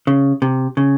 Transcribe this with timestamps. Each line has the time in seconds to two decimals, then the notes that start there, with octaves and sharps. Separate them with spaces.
0.07 C#3
0.42 C3
0.77 C#3